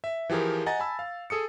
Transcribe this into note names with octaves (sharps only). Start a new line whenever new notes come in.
E5
E3 F3 G4 G#4 A#4
D#5 F#5 G#5 A#5 A6
G#5 A5 B5 E6
F5
G#4 A4 D#6 C#7